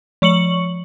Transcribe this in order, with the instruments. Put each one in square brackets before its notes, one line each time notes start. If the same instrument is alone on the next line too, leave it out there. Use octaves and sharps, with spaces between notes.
[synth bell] F3 C#6 C#7 F#7